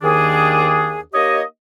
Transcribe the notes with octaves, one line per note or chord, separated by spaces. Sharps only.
D#2 D#3 D4 G#4
A#3 D#4 G4 C#5 D#5